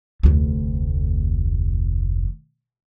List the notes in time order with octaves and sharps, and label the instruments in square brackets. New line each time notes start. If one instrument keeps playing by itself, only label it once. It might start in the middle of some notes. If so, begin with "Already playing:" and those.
[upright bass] F1 D2